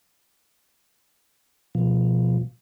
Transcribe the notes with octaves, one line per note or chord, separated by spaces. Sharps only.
B2 F3